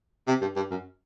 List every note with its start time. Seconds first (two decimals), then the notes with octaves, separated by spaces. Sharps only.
0.27 C3
0.41 G2
0.56 G2
0.71 F#2